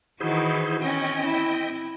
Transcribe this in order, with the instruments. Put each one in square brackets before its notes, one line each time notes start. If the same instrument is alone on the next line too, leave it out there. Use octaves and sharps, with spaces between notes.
[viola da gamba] D#3 E3 F#4 [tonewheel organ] E4 G#4 C5
[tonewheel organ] C4 D#5 G5 [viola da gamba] C#4
[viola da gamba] E4